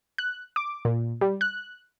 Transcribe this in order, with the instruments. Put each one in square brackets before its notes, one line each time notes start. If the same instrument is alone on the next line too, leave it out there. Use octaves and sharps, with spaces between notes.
[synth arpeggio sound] F#6
D6
A#2
G3
F#6